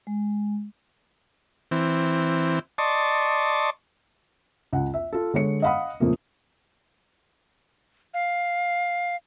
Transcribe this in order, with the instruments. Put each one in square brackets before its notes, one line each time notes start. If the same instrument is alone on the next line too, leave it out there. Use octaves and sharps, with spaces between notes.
[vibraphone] G#3
[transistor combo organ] E3 C4
D5 D#5 A5 C6 C#6
[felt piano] C#2 F#5
E5
F4 A4
D3 G#3 C#5 C#7
D#5 F5 F#5 B5 D#6
F2 A#2 C#3 A3 A#3
[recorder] F5